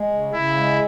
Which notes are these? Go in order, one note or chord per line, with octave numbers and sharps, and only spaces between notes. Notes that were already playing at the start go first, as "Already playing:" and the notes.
Already playing: G#3
C#3
C#3 E4
G#3